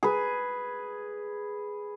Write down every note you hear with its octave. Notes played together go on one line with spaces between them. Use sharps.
G#4 B4